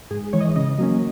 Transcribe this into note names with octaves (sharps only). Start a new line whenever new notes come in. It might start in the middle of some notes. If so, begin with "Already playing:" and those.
G#2 G#4
E3 G#3 C#5
D#5
C#3 D#5
F#3 A#3 C#4